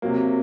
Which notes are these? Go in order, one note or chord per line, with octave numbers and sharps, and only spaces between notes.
C3 F#3 A#3